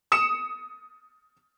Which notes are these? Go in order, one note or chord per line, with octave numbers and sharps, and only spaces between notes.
D#6 C#7 E7